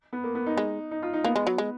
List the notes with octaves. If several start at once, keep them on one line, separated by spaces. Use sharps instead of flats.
B3
A#3
B3
D#4
G#3
D#4
F4
D#4
A#3 B3
G#3
F#3
G#3